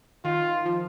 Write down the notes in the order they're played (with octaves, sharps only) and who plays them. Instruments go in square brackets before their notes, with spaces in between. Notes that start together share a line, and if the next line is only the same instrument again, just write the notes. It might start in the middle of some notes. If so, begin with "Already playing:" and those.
[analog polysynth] D#3 [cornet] F4
[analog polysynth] F3